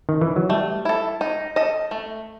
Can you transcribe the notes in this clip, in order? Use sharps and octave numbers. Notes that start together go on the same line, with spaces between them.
D#3
E3
F#3
G3 A3
E4 A4
D#4
A4 D#5
A3